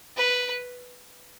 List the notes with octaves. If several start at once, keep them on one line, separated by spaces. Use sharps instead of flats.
B4